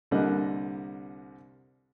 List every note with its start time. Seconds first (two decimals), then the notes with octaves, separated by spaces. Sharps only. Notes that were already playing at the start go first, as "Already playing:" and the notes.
0.11 C2 D3 G3 A#3 D#5 F#6